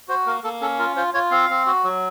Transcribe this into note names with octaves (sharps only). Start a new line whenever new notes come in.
F#4 C5
A#3 A#4
A#3 A4
C#4 A4
F4 A#4
F4 C5
F4 C#5
C4 F5
C4
F#4
F#3